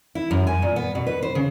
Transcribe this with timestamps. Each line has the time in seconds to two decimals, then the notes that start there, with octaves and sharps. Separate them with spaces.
0.15 E4
0.31 F#2
0.47 G#5
0.62 A#2
0.76 B3
0.95 B2
1.07 B4
1.23 C5
1.35 C#3